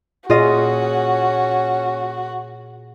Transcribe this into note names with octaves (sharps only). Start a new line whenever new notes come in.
A#2 C#4 F4 F#4 G#4 D#5 E5